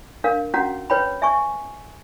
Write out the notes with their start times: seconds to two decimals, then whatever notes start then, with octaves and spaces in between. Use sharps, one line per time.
0.24 D4 A#4 F5
0.54 C#4 F#4 F#5 A#5
0.90 B4 C#5 G5 B5
1.22 E5 G#5 C#6